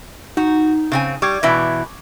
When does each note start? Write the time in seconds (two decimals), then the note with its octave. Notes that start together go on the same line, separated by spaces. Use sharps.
0.37 D#4 F#4
0.92 C#3 C4 G#5
1.22 G3 C#6 D6 G#6
1.43 B2 E3 E5